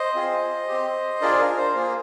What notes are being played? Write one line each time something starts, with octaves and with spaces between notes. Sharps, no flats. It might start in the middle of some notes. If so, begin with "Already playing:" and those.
Already playing: C5 D#5
C4 F4 G#4
C4 G4
D4 F4 G#4 A#4 D5
A#4
C5
A#3 F4 G#4 A#4